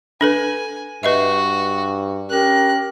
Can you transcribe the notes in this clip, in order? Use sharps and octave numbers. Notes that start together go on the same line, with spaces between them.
D4 A4 B4 G#5
G2 F#4 B4 D#5 E5
C#4 G4 A#4 F#6